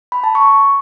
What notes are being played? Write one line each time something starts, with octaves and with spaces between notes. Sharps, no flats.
B5
A5
C#6